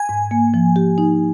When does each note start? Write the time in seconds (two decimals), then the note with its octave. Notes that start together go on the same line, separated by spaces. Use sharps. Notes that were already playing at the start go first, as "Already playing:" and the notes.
Already playing: G#5
0.09 G#2
0.31 A#3
0.54 F3
0.76 G4
0.98 D#4